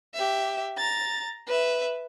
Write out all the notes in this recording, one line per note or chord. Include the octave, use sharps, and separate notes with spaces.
G4 E5
A#5 A6
B4 E5